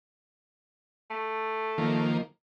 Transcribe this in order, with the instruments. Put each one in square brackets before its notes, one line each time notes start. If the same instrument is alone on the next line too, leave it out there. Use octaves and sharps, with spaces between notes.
[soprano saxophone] A3
[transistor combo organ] D#3 F3 A#3